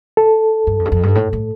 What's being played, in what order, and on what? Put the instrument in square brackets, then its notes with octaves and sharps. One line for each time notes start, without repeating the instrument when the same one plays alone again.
[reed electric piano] A4
[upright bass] G2
F2
G2
F2
G2
A2
A2